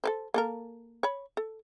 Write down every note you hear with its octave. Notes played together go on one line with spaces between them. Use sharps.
A4 B4 C5
A#3 A4 A#4
C#5 B5
A4